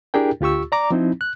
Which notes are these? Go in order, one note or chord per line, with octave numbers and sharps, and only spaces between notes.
D4 E4 G4 G#4 A#4 G5
D2 F4 G4 C#6 E6
D5 A#5 D6
F3 C4 D#4 E4
F#6